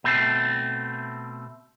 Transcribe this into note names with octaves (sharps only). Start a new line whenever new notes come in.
B2 A3 C4